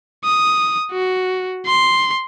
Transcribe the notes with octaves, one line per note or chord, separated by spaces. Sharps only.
D#6
F#4
C6